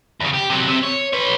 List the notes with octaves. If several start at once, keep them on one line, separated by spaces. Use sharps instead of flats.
E2 C#3
G4
C3 F#3
C3
C#5
B4 C#5